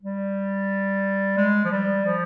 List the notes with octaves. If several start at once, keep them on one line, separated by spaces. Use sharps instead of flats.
G3
G#3
F3
G3
F3